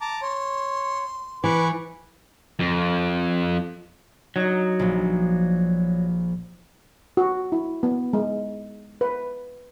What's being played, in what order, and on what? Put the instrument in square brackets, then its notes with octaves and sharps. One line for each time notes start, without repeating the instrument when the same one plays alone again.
[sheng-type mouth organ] A5 A#5 D6
[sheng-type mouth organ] C#5 [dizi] C6
[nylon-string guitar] E3 [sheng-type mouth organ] B4 C#6 D6
[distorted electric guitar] F2
[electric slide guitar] F#3 [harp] D#4 D#5
[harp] A#1 F3
[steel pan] F#4
E4
B3
G#3
B4